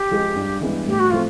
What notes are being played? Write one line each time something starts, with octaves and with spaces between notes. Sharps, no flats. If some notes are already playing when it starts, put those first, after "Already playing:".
Already playing: G4
F3 G#3
G2
E3 G#3 B3
A2 G4
F#4
F3 A3 C4 F4